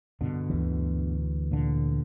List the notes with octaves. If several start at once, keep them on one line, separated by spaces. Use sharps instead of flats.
G2 B2 D3
D2 E3
A#2 D3